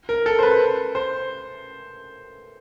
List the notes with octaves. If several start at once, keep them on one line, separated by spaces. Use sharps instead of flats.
A#4
A4
C5
B4
C5